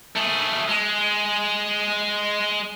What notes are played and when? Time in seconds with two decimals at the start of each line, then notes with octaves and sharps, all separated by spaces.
0.16 A3 G#4
0.68 G#3